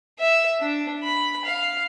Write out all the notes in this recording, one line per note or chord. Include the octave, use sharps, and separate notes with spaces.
E5
D4
B5
F5